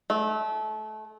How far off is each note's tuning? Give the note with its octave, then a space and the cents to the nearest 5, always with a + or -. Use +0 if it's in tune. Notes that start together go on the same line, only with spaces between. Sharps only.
A3 -30